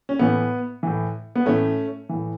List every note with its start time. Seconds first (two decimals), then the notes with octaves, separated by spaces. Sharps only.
0.09 C#4
0.19 A2 E3 B3
0.83 A2 E3
1.35 B3
1.46 A2 E3 A3 C#4
2.09 A2 E3